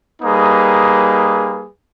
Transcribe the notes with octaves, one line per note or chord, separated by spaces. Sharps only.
G3 A#3 D#4 G#4 B4